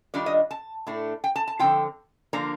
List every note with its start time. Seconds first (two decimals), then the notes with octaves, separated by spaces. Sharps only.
0.14 D#3 G3 D4 F4 D5
0.26 D#5
0.51 A5
0.87 A2 A3 D4
1.24 G5
1.36 A5
1.48 A5
1.59 D3 F3 C4 F4 G5
2.33 D3 F3 A#3 D4 A#5